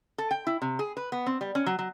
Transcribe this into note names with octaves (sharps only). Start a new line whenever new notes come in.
A4
G5
E4
C3
G#4
B4
B3
C4
G3
C#4
F#3
F#3